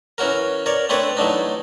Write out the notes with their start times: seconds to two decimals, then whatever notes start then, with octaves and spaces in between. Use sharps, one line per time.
0.18 E3 C#4 F#4 A#4
0.66 A#4 C#5 D5
0.89 A3 C4 D4 B4 C#5 D5
1.17 E3 F#3 A3 D4 D#4